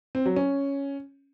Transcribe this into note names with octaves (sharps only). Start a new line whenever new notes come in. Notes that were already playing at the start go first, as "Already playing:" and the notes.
C4
F#3
C#4